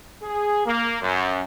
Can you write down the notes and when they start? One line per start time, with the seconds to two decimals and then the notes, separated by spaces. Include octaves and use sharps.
0.23 G#4
0.66 A#3
1.02 F#2